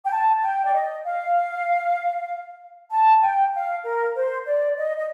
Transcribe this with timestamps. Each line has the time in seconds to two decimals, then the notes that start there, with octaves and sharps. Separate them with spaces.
0.05 G5
0.11 A5
0.42 G5
0.65 D5
0.73 D#5
1.05 F5
2.91 A5
3.22 G5
3.54 F5
3.84 A#4
4.16 C5
4.46 D5
4.78 D#5
4.97 D#5